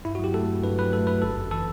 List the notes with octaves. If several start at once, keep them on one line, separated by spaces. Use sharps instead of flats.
G2 E4
F#4
F#3 G4
A3 A4
G2
G2 B4
F#3 B4
A3 A4
G2 B4
G1 A4
F#2
E3 A4